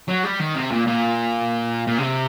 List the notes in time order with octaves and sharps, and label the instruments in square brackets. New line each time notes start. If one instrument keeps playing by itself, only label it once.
[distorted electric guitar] F#3
G3
D#3
C3
A#2
A#2
A#2
C3